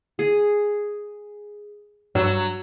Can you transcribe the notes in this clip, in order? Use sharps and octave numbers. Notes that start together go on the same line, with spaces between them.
G#4
G2 F#3 E6 E7